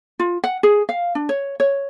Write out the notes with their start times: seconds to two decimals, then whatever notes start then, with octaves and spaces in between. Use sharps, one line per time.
0.19 F4
0.44 F#5
0.63 G#4
0.89 F5
1.15 D4
1.29 C#5
1.60 C#5